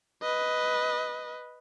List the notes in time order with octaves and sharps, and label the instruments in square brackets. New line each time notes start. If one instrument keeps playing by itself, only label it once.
[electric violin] B4 D#5